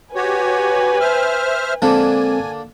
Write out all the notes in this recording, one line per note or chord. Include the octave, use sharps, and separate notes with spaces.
F#4 G4 B4 C#5 G#5
C5 E5 F6
D3 G#3 A#3 C4 D4 A4 G#5